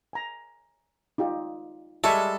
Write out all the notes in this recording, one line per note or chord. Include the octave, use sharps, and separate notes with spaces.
G#5 A#5
D#4 F4 G4
G3 G#3 A4 E5 G#5 C#6